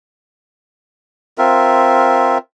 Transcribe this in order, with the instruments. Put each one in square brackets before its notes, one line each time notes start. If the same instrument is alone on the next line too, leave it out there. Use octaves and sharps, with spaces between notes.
[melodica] C4 F4 A#4 E5